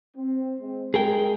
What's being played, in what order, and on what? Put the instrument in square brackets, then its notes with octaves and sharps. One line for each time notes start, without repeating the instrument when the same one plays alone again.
[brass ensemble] C4
G#3 C4
[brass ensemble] G#3 [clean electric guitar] G#4 A#4 G5